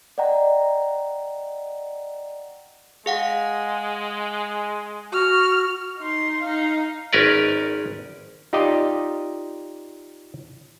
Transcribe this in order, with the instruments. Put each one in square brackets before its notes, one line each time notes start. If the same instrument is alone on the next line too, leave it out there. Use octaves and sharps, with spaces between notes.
[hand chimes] D5 D#5 F#5 G5 A#5
[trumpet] G#3 [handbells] G#4 F5 F#5
[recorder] F#4 [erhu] F6
[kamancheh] D#4 C6
D#4 F5
[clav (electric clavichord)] G#1 C#4 A#4 B4 D5
D#4 F4 G4 D5 D#5